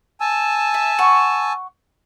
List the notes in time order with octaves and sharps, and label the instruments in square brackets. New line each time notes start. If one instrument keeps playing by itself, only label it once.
[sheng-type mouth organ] G#5 A5 E6
[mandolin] E5
F#5 C#6